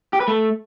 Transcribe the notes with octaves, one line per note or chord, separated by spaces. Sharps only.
G4
B4
A3